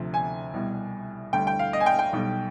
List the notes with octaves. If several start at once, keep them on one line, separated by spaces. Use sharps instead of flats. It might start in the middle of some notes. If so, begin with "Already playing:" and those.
Already playing: D2 C3 F3
G#5
C2 B2 G3
D2 D3 G3 G5
G5
F5
D#5
G#5
G5
G5
B1 B2 G3